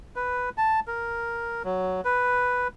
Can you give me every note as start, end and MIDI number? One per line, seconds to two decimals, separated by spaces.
0.16 0.50 71
0.58 0.80 81
0.88 1.63 70
1.65 2.01 54
2.05 2.68 71